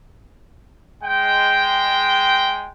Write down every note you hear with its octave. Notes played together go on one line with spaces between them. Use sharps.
G#3 G5